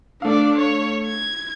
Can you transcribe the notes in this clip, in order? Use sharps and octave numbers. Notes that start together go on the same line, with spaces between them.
A3 D4 D5 F5
C#5
G#6